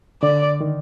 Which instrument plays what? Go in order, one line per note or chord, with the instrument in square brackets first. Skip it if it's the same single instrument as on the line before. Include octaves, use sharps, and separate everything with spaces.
[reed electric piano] D3 [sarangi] D5
[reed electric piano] D#3